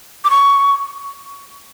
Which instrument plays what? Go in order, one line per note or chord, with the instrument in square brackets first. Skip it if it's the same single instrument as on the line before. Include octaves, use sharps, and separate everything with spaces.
[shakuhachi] D6
C#6